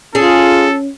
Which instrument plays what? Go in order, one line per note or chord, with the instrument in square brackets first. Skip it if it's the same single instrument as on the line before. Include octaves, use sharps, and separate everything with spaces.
[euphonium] C#4 [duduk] F4 [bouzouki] G#4 [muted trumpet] A4